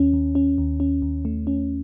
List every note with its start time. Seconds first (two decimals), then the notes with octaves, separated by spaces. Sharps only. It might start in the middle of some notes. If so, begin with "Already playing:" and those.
Already playing: D#2 C#4
0.14 D#2
0.35 C#4
0.58 D#2
0.80 C#4
1.02 D#2
1.25 A3
1.47 C#4